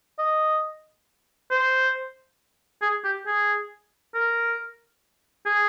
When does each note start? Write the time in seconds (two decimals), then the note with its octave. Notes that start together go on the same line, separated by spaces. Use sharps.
0.18 D#5
1.51 C5
2.82 G#4
3.04 G4
3.27 G#4
4.14 A#4
5.46 G#4